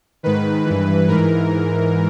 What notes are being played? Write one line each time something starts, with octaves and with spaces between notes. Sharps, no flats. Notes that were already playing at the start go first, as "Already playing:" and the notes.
G#2 D#3 B4
G2 E3
G#2 E3 A#4